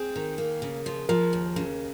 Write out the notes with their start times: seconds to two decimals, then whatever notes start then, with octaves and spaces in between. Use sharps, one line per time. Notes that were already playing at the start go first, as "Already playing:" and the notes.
Already playing: C4 G#4
0.16 D#3
0.38 A#3
0.62 C#3
0.86 F3
1.09 F3 A#4
1.33 D#2
1.56 C#3